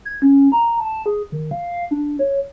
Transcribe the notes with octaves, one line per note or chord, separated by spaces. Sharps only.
G#6
C#4
A#5
A5
G#4
D#3
F5
D4
C#5